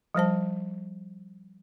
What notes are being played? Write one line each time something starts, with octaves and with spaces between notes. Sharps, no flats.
F3 G3 C5 A5